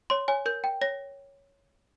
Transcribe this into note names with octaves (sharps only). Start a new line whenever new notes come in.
C#5 C6
C#5 G#5
A#4 G6
G5
C#5 A#6